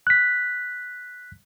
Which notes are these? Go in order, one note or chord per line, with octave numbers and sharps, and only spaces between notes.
F#6 B6